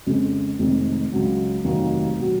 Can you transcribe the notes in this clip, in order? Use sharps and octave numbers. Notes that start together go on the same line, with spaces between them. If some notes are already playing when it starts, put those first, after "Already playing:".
F2 C#3 G#3 C#4
F1 F2 D#3 G#3
C#2 C#3 F#3
F1 D#2 D#3 F#3 A#3
B2 F#3